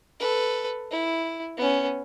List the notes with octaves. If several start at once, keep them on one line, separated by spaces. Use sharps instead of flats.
A4 B4
E4
B3 C#4